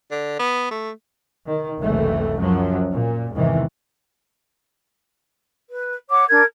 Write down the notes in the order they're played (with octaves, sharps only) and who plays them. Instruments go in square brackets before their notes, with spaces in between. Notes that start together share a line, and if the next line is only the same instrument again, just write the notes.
[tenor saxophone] D3
B3
A3
[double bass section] D#3
F#1 C#2 F#2 C3 E3 A3
F#2 F3 F#3
A#2
E2 G#2 C3 D#3 E3
[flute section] B4
C#5 F#5 D6
D4 A#4 G#6